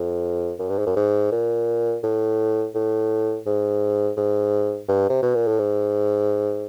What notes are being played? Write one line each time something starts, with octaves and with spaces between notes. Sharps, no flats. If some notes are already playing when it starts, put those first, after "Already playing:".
Already playing: F2
F#2
G2
G#2
F#2
G#2
A#2
A2
A2
G#2
G#2
G2
C3
B2
A#2
A2
G#2